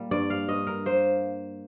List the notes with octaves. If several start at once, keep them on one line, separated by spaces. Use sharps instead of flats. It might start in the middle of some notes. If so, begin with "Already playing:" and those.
Already playing: A#2 G3 A#3
G2 D5
F5
G2 D#5
A#4
A#3 C5